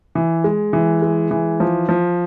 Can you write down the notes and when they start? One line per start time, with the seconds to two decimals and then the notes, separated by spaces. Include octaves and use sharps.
0.15 E3
0.44 G#3
0.73 E3
1.02 G#3
1.31 E3
1.60 F3
1.89 F3